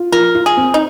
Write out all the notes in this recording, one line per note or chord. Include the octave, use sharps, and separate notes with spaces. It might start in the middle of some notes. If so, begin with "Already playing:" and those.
Already playing: F4
F3 A#4
F4
G#4
C4
D#4